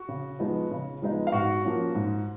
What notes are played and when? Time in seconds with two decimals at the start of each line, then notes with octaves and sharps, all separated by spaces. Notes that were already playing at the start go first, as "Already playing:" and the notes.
Already playing: F#4
0.09 C#3
0.39 F3 G#3 B3 D#4
0.71 C#3
1.02 F3 G#3 B3 D#4
1.27 F5
1.32 G#2 F#4 F#5
1.64 F3 A#3 C#4
1.95 G#2